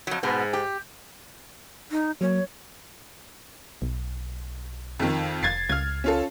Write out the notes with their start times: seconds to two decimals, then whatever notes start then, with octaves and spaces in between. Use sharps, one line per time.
0.07 F2 F#3
0.23 G#2 B2 B3
0.53 G4
1.91 D#4
2.21 F#3 A#3 C#5
3.82 B1
4.99 F2 D#3
5.43 F1 G#6 A6 C7
5.69 C#2 F6 G#6
6.04 C#4 F4 A4